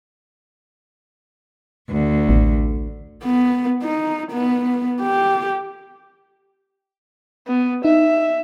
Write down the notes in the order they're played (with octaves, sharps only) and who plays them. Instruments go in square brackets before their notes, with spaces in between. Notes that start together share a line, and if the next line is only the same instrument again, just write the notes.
[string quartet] D2
[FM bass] A1
[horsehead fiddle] B3
D#4
B3
G4
[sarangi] B3
[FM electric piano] D#4 [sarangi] E5